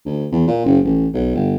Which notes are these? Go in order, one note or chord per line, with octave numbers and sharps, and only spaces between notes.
D2
E2
A#2
F#1
A1
B1
G1